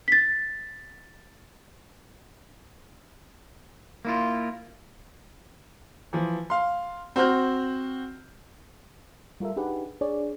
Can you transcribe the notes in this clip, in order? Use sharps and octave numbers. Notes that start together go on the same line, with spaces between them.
A6 B6
A#3 E4 F4
E3 F3
F5 C6
C4 F#4 C5 F6 G6
G3 F4 A4 A#4 E5
D4 D#4 G4 G#4 B4 F#5
D4 G#4 C#5 D5